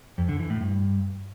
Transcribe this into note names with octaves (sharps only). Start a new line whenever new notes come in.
F2
D3
E3
A2
G2